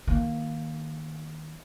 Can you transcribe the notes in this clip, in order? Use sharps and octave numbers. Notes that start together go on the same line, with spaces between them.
D#3 A#3